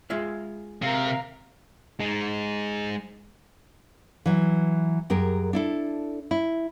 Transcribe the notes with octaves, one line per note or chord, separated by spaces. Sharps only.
G#3 F4 E5
C3 A#4 F5
G#3 D#4
E3 F#3
F#2 G4 G#4 A#4
D4 E4 A4
E4